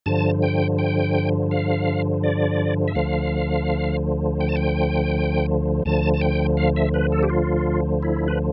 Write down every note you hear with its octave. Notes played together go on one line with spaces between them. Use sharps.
G2 D3 F3 A5
G5
G5
F5
D5
E5
D2 D3 F3 F5
G5
A5
G5
D2 D3 F3 A5
A5
G5
F5
E5
B4
A4
G4
F4
E4
B4